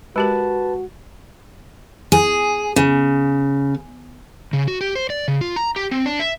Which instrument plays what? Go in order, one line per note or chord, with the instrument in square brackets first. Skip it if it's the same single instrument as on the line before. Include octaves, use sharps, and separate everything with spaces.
[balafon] G#3 G4 A#4 [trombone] F#4 [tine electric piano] B4 A5
[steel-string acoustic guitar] G#4
C#3
[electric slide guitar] C#3
F#4
G4
C5
D5
C#3
F4
A#5
G4
C4
D4
E5